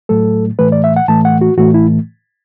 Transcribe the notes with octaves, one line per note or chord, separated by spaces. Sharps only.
A2 F#3 A3 A4
A2 E3 A3 B4
D5
E5
F#5
A2 E3 A3 A5
F#5
F#4
A2 E3 A3 F#4
E4